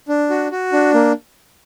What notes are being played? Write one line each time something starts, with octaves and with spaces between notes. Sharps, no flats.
D4
F#4
F#4
D4
A#3